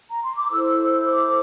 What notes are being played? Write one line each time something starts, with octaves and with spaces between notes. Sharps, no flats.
A#5
C6
D6
E4 A4 C5 E6
D6